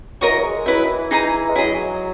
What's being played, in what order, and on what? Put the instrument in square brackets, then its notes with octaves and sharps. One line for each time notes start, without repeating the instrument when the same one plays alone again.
[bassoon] F#3 [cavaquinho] A#4 D#5 A#5 C#6
[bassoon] E3
F#3
G#3
[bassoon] F#3 [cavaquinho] E4 B4 E5
[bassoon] D#3
E3
[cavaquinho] D#4 G#4 D#5 A#5
[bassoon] G#3
[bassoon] F#3 [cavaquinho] E4 G#4 D#5